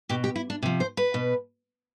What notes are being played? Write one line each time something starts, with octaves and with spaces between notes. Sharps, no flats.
B2 G4
G4
E4
D4
C3 F3
C5
B4
B2